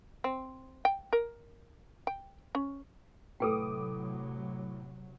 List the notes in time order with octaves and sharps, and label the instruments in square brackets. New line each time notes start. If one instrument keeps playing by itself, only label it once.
[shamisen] C4
G5
A#4
G5
C#4
[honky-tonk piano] A2 D6 D#6 [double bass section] C3 F#3 [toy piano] A4 B4 G5